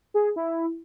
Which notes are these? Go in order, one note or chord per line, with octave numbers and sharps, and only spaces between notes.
G#4
E4